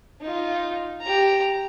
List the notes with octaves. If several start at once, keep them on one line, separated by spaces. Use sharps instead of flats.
D#4 F4
G4 A#5